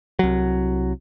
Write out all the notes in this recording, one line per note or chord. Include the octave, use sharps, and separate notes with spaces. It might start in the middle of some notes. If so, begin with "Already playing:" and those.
C2 F#3